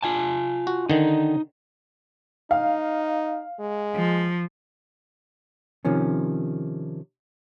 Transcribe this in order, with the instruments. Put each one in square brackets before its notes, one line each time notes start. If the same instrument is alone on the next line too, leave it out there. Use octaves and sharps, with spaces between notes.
[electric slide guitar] F4 G#5 A5
[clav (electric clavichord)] F#4
[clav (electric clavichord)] D3 D#3 [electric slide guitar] D#4
[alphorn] D#4 [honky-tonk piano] F5
[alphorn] G#3
[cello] F3
[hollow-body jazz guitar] C3 D#3 F3 C#4